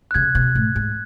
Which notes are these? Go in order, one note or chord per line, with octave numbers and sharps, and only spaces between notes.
F#6
C#3 G#6
B2
A2
G#2